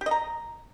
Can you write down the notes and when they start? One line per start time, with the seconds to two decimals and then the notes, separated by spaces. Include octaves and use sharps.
0.01 G4
0.06 D#5
0.11 A#5